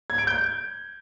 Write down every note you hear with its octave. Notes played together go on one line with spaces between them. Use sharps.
G#6
D7
G6